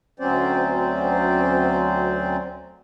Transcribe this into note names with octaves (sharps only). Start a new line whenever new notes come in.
D2 F#3 C4 C#4 C5 D5